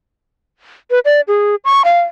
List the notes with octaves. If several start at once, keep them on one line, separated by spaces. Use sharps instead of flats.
B4
D5
G#4
C#6
F5